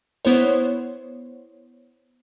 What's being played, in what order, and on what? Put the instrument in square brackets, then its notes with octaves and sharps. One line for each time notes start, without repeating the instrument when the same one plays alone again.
[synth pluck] B3 E4 C5 C#5